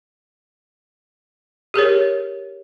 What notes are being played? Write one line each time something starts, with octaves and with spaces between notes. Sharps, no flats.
G4 G#4 A#4 C#5